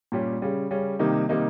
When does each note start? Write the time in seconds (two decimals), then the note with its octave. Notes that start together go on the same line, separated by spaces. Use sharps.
0.12 A#2 G3 C#4 G4
0.42 C#3 G3 C#4
0.71 C#3 G3 C#4
0.99 C3 D#3 G3 A#3 D#4
1.29 C3 D#3 G3 A#3 D#4